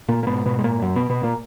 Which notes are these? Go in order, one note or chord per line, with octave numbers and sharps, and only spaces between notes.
A#2 A#3
A#3
G#2 B2 B3
B2 B3
G#3
A#2 A#3
F#2 F#3
B2 B3
B2 B3
A#2 A#3